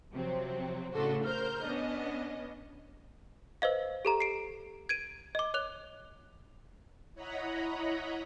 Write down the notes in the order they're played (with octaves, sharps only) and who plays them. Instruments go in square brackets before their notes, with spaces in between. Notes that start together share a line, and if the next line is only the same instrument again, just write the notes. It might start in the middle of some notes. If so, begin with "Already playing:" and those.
[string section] C3 F3 F#3 C4
A2 C#3 D4 F#4 A4 C6
A#4 C5 F6 G6
B3 C#4 D4 D#5
[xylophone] B4 C5 D#5 F5
G4 A4 A#5
C7 D7
G#6 D7 D#7
D#5 D6
C#5 D6 F#6 F7
[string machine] E4 C#5 D#5 F#5 A#5 B5